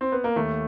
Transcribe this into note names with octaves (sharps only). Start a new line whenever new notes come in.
C4
B3
A#3
D#2 A3